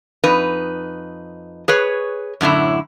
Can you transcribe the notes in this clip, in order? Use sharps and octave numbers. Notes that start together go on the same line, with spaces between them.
F2 D#4 B4
G#4 B4 C#5
F#2 A2 D3 E4